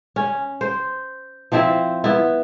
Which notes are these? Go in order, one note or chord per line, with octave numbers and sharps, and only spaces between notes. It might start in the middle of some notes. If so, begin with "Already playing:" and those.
C#4
C5
F3 C4 E4 E5
B3 E4